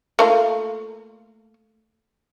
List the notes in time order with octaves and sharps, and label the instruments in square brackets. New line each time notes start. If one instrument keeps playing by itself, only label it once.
[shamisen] A3 A#3 F4